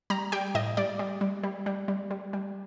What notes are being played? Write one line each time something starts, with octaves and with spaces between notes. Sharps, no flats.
G3 A#5
G3 G5
A2 D#5
G3 D5
G3
G3
G3
G3
G3
G3
G3